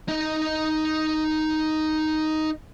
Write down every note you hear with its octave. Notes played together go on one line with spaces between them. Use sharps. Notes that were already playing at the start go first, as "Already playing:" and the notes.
D#4 D#5